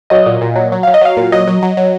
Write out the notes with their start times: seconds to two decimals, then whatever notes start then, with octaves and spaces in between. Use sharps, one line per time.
0.10 F#3 D#5
0.26 A#2
0.41 A#2
0.56 F#3
0.72 F#3
0.83 F#3 F5
0.94 D#5
1.01 F#3 F5
1.17 A#2
1.32 F#3 D#5
1.47 F#3
1.62 F#3
1.77 F#3